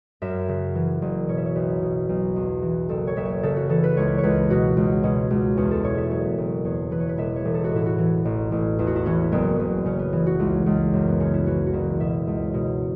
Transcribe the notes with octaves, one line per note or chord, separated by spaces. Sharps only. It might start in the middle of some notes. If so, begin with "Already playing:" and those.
F#2 E5
C#3
E3
F#1
B2 C#5
E5
C#5
B1 B4
B2
B1
E2
E3
F#1 A4
C#5
F#1 E5
C#5
C#3 A4
F#4
E3 A4
B4
C#2 C#5
C#5
C#2 B4
B2 F#4
C#2
B2 C#4
C#2
E2 C#4
A4
B2 C#5
E5
F#1 C#5
F#1
E2 C#5
E3 B4
C#5
B4
E1 E5
C#5
E1
A4
F#4
A2 E4
F#4
E3
A1
A1
E2 E4
F#4
E4
E3 C#4
F#1 B3
F#1
C#3 C#4
B3
E3
F#4
C#2
C#2
F#2
B3
C#3 C#4
E4
E3 F#4
F#4
F#1 E4
B2 E5
C#2
B2